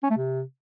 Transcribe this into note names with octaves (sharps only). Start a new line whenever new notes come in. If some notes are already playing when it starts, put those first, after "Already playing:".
C#4
A3
C3